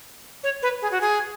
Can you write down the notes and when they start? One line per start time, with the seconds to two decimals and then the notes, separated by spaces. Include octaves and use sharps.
0.43 C#5
0.62 B4
0.82 G#4
0.91 F#4
1.01 G#4